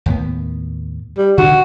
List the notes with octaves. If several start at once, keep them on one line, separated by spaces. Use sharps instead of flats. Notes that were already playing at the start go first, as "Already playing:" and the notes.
D#2 A2 B3
G3
D3 D4 F#4